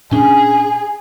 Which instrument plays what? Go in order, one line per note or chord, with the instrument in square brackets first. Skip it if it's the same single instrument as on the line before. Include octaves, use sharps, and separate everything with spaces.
[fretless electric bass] A#2 C#4 D4 [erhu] G#4